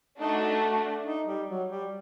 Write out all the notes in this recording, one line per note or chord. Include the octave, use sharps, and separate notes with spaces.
A3 D4 D#4 F#4
D4
D#4
G3
F#3
G3